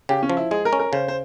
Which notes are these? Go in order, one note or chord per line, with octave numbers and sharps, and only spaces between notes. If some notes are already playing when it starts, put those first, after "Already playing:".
C#3 G4
C#4
F3
E4
G#3 G#4
A#4
C#4
A#4
C#3 C5
C5